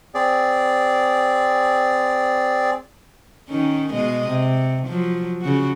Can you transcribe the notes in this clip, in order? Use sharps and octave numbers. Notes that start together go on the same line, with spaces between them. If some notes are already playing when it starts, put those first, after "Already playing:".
C4 G#4 D5
D#3 C#4 D#4
B2 G#3 D#5
C3
F3 F#3
C#3 F#4